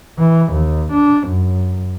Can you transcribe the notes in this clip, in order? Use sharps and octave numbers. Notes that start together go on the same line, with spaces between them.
E3
D#2
D4
F#2